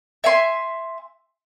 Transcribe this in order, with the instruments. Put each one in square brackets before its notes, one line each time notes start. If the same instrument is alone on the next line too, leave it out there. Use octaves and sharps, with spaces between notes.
[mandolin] E5 G#5 C6